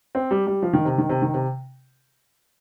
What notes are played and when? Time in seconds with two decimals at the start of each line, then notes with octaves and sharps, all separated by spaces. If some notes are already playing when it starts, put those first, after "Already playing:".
0.15 C4
0.31 G3
0.47 G3
0.62 F3
0.73 D#3
0.85 C3
0.98 D#3
1.09 C3
1.22 D#3
1.34 C3